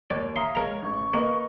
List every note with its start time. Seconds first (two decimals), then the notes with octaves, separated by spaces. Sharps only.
0.10 D#2 C#5 D5 G#6
0.36 E5 F5 A#5 C6 D#6
0.55 G#3 A#4 C#5 A#5
0.82 A1 C#6
1.14 A#3 A#4 B4 D#5